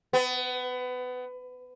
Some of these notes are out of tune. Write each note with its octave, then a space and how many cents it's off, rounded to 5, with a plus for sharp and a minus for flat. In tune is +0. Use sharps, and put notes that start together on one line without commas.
B3 +25